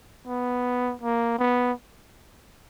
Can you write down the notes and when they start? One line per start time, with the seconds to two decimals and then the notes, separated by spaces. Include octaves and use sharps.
0.27 B3
1.01 A#3
1.39 B3